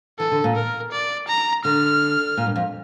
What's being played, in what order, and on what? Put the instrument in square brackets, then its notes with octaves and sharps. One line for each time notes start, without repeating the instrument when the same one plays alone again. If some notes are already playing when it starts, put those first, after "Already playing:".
[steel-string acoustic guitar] E3 [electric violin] A4
[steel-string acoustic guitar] D3
A#2
[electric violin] A#4
D5
A#5
[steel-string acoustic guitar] D3 [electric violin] F6
[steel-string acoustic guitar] A#2
G2
F2